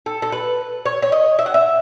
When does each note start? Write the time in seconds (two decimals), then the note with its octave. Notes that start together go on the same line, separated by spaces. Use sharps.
0.06 A4
0.22 A4
0.32 B4
0.86 C#5
1.02 C#5
1.12 D#5
1.39 E5
1.46 F#5
1.54 E5